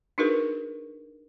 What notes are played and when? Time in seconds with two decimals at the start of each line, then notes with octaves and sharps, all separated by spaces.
0.18 D4 D#4 F#4 G#4 A#4 B4